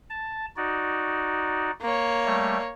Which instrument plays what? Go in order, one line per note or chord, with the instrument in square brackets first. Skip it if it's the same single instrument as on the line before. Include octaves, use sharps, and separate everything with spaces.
[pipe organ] A5
D#4 F#4 D5
[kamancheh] A#3 C#5
[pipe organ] G3 A3